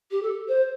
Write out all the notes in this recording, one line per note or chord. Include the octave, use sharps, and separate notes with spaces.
G4
A4
C5